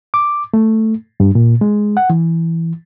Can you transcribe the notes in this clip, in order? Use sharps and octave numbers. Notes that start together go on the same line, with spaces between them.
D6
A3
G2
A#2
G#3
F#5
E3